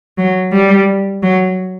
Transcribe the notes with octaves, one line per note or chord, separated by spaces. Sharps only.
F#3
G3
F#3